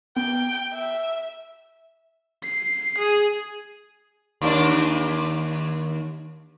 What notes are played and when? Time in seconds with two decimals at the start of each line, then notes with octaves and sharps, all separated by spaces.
0.16 B3 G5
0.73 E5
2.44 C7
2.98 G#4
4.42 D#2 D4